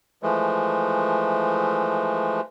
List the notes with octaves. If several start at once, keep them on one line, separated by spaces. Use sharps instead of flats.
E3 F3 G#3 A3